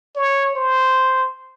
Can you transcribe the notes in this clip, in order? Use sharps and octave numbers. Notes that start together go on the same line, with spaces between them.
C#5
C5